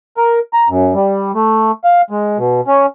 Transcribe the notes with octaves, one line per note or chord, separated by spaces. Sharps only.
A#4
A#5
F#2
G3
A3
F5
G#3
B2
C#4